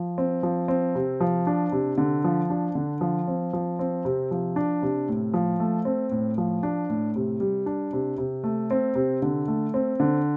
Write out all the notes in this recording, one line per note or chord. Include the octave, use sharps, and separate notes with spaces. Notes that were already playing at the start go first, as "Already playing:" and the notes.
Already playing: F3
C4
F3
C4
C3
F3
D4
C3
D3
F3
D4
D3
F3
C4
F3
C4
C3
F3
D4
C3
A2
F3
A3
C4
A2
F3
D4
A2
C3
G3
D4
C3
C3
A3
C4
C3
D3
A3
C4
D3